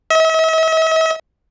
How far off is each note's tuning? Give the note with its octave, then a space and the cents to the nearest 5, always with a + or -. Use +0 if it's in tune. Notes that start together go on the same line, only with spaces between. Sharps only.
E5 -45